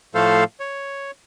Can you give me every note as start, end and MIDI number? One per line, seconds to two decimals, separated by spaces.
0.15 0.44 45
0.15 0.44 53
0.15 0.44 57
0.15 0.44 69
0.15 0.44 72
0.15 0.44 77
0.60 1.11 73